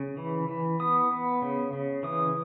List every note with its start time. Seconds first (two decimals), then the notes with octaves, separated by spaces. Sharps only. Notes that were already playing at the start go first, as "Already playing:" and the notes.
Already playing: C#3
0.17 E3
0.48 E3
0.80 B3 D#6
1.11 B3
1.42 C#3
1.73 C#3
2.03 E3 D#6